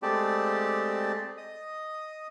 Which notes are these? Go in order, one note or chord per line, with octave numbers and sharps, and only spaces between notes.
G#3 A3 C4 G4 D5 A5
D#5 D#6